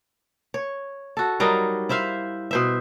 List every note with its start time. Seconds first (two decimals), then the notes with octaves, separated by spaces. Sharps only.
0.54 C#5
1.17 F#4 A4
1.40 F#3 G3 D#4 A#4
1.89 E4 C5 E5 F5
2.51 B2 C5 E5